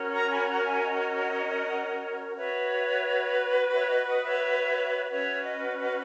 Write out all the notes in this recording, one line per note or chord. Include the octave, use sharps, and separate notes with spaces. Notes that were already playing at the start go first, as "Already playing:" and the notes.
Already playing: C#4 F#4 A#4 C#5
A#5 C#6
G#5 B5
F#5 A#5
E5 G#5
D#5 F#5
F#4 B4 C#5 E5
C#5 E5
D#5
D#5 F#5
C#5 E5
C#4 F#4 B4 C#5 E5
D#5
D#5